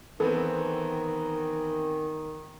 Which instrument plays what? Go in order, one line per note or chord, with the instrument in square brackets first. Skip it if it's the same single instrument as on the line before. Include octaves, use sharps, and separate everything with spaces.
[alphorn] D#3 [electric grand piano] E3 B3 C4 [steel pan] A4